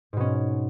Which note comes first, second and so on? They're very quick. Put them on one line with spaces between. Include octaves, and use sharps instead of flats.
G#2 B2 C#4